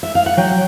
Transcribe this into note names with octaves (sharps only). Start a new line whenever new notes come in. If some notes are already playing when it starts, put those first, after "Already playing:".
E5
F5
F#5
F#3 G5